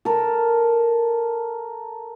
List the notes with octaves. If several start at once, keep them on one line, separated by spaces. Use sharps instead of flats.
A4 A#4